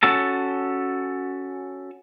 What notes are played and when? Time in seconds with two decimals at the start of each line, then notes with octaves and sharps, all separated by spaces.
0.03 C#4 F#4 A4 A5